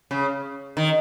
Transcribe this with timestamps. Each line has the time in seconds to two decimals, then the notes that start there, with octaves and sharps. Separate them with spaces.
0.11 C#3
0.77 D#3